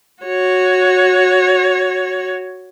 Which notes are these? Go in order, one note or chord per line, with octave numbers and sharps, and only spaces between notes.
F#4 C#5